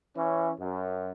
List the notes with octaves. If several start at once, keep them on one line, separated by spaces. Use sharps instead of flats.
E3 C#4
F#2